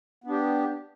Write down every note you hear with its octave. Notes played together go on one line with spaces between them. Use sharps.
B3 D4 G4